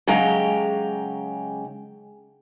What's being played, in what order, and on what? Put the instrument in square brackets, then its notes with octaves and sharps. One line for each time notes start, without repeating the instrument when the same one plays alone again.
[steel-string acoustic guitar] C#3 F#3 G#3 G4 G5 A#5